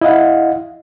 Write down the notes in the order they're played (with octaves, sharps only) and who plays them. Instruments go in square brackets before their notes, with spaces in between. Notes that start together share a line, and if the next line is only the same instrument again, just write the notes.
[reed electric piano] E4 D#5 F5 F#5